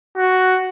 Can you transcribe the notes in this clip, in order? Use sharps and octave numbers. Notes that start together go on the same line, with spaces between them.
F#4